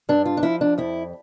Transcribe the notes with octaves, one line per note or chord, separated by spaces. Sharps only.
G2 D4
F4
D4
F3 E4
D4
F2 E4